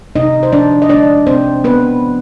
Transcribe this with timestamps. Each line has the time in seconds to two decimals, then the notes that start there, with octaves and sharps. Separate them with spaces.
0.16 C3 D#4 D#5
0.43 C5
0.52 F3 D4 D5
0.82 D#5
0.89 G#3 D4 D5
1.27 C3 C4 C5
1.64 C3 B3 B4
2.01 F3